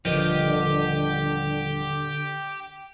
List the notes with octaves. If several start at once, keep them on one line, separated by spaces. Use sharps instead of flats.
D#1 D3 F3 G4 A#4 B4 D#5